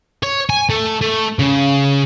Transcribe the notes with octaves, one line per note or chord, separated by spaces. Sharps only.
C#5
G#5
A3
A3
C#3